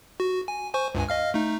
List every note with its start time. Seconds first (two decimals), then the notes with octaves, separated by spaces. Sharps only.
0.20 F#4
0.48 G#5
0.74 C5 G#5 C#6
0.95 C#2 G2 G#5
1.09 D#5 F5 F6
1.34 A3 D#4